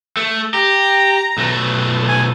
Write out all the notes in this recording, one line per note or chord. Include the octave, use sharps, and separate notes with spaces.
A3
G4 A#5
B1 A3
G#5